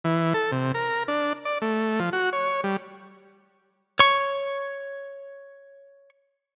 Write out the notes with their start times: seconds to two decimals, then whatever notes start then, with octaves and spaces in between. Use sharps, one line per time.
0.04 E3
0.34 A4
0.52 C3
0.74 A#4
1.08 D4
1.45 D5
1.62 A3
2.00 F3
2.13 F#4
2.33 C#5
2.64 G3
3.99 C#5 C#6